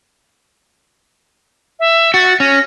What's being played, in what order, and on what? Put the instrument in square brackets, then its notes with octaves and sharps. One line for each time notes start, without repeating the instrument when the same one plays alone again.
[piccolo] E5
[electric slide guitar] F#4 [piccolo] A6
[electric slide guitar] C#4 [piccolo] A#6